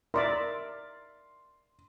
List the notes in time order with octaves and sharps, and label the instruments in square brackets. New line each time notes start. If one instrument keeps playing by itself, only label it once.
[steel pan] A#4 D5 E5 [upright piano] C6